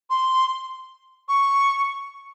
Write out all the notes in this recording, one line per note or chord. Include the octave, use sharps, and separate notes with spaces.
C6
C#6